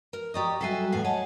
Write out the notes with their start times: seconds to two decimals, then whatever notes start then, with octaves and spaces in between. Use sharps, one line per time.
0.13 A#4
0.34 G4 D5 D#5 A#5 C#6 D#6
0.61 F#3 G3 F#4 A4 E5 G#5
0.92 E2 A2 F5 F#5 G#5
1.05 C#5 D#5 F#5 A5